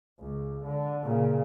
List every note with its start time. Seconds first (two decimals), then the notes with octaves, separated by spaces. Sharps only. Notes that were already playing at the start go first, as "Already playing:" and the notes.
0.20 C#2
0.64 D3
1.03 A#2 C#3